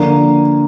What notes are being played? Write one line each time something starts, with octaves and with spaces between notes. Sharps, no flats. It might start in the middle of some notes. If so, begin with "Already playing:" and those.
Already playing: D3 F3 A#3